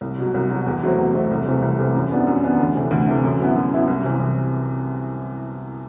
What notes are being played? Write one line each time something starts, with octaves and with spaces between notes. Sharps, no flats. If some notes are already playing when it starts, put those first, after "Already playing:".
C2
B2 F#3
C2
B2 F#3
E2
B2 F#3 A3 C4
E2
B2 F#3 A3 C4
C2
C3 E3 A3 C4
C2
C3 E3 A3 C4
F#2
E3 B3 D4
F#2
E3 B3 D4
D2
C3 E3 A3
D2
C3 E3 A3
F#2
F#3 B3 E4
F#2
F#3 B3 E4
C2
C3 E3
C2